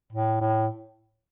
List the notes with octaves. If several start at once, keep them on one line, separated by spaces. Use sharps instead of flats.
A2
A2